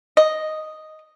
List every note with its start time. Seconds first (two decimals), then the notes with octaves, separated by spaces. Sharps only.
0.17 D#5